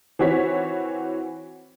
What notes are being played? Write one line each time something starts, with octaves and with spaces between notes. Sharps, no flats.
E3 C4 F#4 C#5 B6